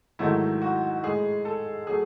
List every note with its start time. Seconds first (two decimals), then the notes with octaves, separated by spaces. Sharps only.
0.19 G#2 D#3 F#3 A3 E4
0.62 F#4
1.03 A2 G#3 G#4
1.45 A4
1.87 F#3 A3 G#4